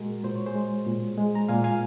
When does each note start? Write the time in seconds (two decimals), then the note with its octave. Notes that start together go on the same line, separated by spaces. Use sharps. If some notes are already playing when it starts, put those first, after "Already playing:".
Already playing: A#2 G#3 F#4 A#4
0.24 A#2 C5
0.35 C#5
0.47 G#4 C5
0.55 G#3
0.86 A#2
1.18 G#3
1.35 A#5
1.49 A#2 F5 G#5
1.64 F5 G#5